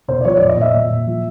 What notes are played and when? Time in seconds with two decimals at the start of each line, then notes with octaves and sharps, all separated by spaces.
0.08 B2 C5
0.21 D5
0.25 F3 C#5
0.37 A#2 D5
0.49 D#5
0.57 A#2 E5
0.74 A#2
0.90 A#2
1.07 F3